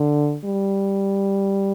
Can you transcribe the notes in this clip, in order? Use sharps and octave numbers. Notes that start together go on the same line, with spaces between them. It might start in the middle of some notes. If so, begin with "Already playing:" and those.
Already playing: D3
G3